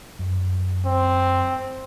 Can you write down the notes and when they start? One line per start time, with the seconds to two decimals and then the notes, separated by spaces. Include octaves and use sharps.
0.19 F#2
0.85 C4